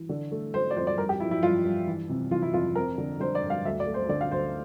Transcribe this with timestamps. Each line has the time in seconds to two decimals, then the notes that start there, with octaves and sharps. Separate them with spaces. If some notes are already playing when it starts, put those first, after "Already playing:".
Already playing: E3
0.09 D3
0.32 A3
0.54 A3 C5
0.71 D5
0.76 F2 C5
0.87 D5
0.98 G2 A#4
1.09 G4
1.20 F3 E4
1.31 E4
1.43 G2 F4
1.64 G2
1.87 E3
2.09 C3
2.31 E3 F4
2.42 E4
2.54 F2 F4
2.75 C4 A#4
2.98 D3
3.20 D3 C5
3.35 D5
3.43 G2
3.50 F5
3.65 D2 E5
3.80 D5
3.87 A3
3.94 C5
4.09 D3 D5
4.21 F5
4.31 D2 C5